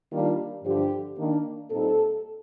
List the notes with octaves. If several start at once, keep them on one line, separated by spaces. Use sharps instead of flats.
D#3 G3 A#3 D4 F4
G2 D3 F3 G4
D#3 A#3 D4
A#2 G3 C4 D#4 A4